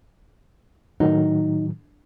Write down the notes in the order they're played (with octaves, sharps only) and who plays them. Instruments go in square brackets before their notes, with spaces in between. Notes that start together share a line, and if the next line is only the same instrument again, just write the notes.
[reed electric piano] A2 D#3 F#3 [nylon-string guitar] D#4